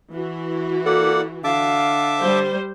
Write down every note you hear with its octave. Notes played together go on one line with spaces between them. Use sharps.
E3 F#4
A#3 A4 D5 F#5
D3 E5 F5 A5 D6
G3 C5